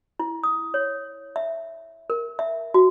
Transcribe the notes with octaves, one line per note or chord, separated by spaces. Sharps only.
E4
D#6
C#5
E5
A#4
E5
F#4